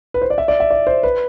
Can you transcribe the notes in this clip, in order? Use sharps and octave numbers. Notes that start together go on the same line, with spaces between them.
B4
C5
D5
E5
D5
E5
D5
C5
B4